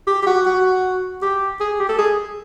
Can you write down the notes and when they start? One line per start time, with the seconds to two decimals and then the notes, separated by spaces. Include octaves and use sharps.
0.07 G4
0.22 G4
0.26 F#4
0.45 F#4
1.22 G4
1.60 G#4
1.80 G4
1.89 A4
1.98 G#4